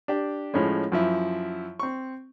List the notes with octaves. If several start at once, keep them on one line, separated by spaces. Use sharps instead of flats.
D4 G4
A2 F3 G#3 C#4
F#2 F3 E4
C4 C#6